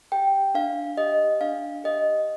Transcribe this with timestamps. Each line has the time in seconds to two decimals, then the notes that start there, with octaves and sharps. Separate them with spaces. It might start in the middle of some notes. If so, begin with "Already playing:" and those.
0.12 G4 G5
0.54 D4 F5
0.97 G4 D#5
1.41 D4 F5
1.84 G4 D#5